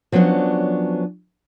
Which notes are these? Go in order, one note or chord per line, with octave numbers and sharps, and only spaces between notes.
F3 F#3 B3 C#4 D4